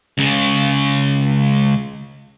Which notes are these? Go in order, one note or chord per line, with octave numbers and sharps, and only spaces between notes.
C#2 C#3